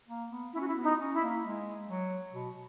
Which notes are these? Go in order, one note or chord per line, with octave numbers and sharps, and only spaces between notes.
A#3
B3
C#4 E4
F#4
E4
B3
D#4
C#4
E4
A#3
G#3
F#3
B2